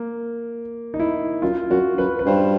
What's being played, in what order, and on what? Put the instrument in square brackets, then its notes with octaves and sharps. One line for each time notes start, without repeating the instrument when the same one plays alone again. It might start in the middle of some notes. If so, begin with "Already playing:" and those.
Already playing: [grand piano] A#3
D#4
E4
[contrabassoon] F#2 [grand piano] F4
[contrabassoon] F#2 [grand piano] F#4
[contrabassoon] F#2 [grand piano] B4
[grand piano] B4
[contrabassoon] G2 [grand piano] C5